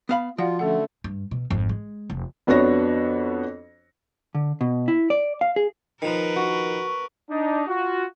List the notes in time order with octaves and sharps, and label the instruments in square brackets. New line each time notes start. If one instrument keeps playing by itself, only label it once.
[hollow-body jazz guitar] B3 F5 B5
[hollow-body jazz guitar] F3 [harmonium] F4 [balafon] F#4 D5 F#5
[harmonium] D3 A3 [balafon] C#4 A4 F#5
[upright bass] G2
B2
G#1 F2
G#3
F1
[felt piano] F2 B3 D4 F#4 C#5 A#6
[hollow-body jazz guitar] D3
B2
E4
D5
F5
G#4
[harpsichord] D#3 F3 [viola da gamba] A#4 B4
[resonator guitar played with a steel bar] F#4
[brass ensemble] D4 D#4
F4 F#4